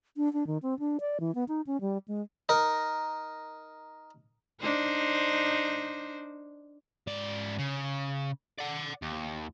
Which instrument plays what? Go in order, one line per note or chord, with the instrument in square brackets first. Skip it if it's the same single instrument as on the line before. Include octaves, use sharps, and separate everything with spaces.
[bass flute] D4
D4
D#3
C4
D4
D5
E3
B3
D#4
C#4
G3
G#3
[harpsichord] D#4 A#4
[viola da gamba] D4 D#4 C5
[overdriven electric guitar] G#2 D5
C#3
D5 F#5
D#2